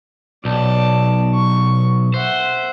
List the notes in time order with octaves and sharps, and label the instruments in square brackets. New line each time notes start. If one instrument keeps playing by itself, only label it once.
[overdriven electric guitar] B1 [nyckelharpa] D5 A5
[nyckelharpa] C#6
[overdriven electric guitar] C5 [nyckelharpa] E5 F#5